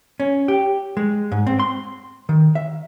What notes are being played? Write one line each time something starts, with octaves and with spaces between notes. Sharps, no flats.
C#4
G4
G#3
G#2
C4
C6
D#3
E5